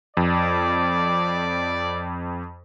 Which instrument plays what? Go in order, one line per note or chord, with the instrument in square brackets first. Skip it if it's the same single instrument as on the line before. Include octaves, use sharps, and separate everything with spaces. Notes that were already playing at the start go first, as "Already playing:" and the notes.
[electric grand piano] F2 [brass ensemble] D5